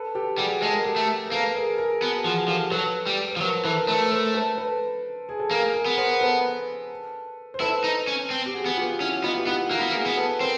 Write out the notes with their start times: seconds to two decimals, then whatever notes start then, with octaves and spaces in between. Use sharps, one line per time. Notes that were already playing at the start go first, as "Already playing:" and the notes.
Already playing: A4 B4
0.15 G4 A4
0.38 G3 F#4 G#4
0.62 G#3 A4
0.73 A#4
0.85 G4 A4
0.96 A3
1.27 A#4
1.31 A#3 A4 B4
1.55 G#4 A#4
1.78 G#4 A#4
2.01 B3 F#4 G#4
2.25 F3 F#4 G#4
2.48 F3 G4 A4
2.71 F#3 A4 B4
3.06 G3
3.31 B4
3.37 F3
3.41 F#3 A#4 C5
3.65 E3 A4 B4
3.77 A#4
3.88 A3 A4 B4
4.06 B4
4.11 A#4 C5
4.35 A4 B4
4.58 A4 B4
5.29 G#4
5.40 A4
5.51 A#3 G#4 A#4
5.74 G#4 A#4
5.86 B3
5.98 A#4 C5
6.21 A4 B4
7.54 C5
7.60 E4 A4 B4
7.84 D#4
8.07 C#4
8.30 C4
8.46 G4
8.54 F#4 G#4
8.66 B3 G#4
8.77 F4 G4
9.00 C#4 E4 F#4
9.24 B3 D#4 F4
9.38 G4
9.47 B3 E4 F#4
9.70 A#3 E4 F#4
9.79 B3
9.89 A#3
9.94 F#4 G#4
10.06 B3
10.17 A4 B4
10.40 C4 A#4 C5